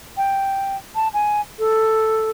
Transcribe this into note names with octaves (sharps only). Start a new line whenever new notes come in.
G5
A5
G#5
A4